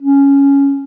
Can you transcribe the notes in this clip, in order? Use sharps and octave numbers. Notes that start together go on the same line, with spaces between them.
C#4